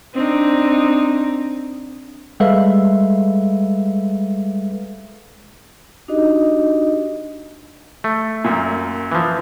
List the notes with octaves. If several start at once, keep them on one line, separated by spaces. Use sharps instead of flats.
C4 D4 D#4
G3 G#3 A4 B4 E5 F5
D4 D#4 F#4 G4 D#5
A3
F#2 A#2
E3 F3